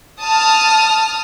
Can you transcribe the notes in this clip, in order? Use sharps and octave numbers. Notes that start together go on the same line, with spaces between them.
A5 D#6 F6